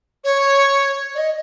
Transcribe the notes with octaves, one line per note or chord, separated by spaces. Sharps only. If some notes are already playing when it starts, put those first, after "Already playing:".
C#5
D5
D#5